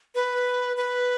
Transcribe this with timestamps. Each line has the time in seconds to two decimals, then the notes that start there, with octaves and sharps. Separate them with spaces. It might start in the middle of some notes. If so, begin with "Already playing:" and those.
0.15 B4
0.77 B4